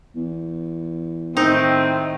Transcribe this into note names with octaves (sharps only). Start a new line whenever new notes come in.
E2
A2 D#3 C4 D#4